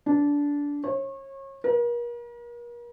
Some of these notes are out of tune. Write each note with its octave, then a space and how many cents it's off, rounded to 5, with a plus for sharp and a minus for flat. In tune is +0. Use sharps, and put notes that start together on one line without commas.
D4 -20
C#5 -30
A#4 +40